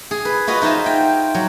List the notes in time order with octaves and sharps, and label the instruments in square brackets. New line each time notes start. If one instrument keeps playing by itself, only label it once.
[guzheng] G#4
B4
F4 F#4 B4 D#5
D#4 F4 C5 E5 G#5
G5
F#3